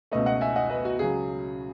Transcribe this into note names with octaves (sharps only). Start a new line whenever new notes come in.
C#2 B2 A3 B4 D#5
D#5 F#5
E5 G#5
D#5 F#5
B4 D#5
F#4
C#2 C#3 F#3 G#4